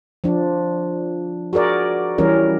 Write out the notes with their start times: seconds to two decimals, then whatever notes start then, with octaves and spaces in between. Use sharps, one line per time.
0.24 F3 D4
1.53 F#4 G#4 A#4 D5
2.18 E3 G3 C#4 A#4